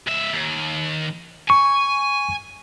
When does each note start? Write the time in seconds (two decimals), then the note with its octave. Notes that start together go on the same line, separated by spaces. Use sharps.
0.07 C#2 E5
0.34 D#2
1.50 G#5 C#6